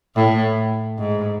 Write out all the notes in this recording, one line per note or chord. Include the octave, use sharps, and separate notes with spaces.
A2
G#2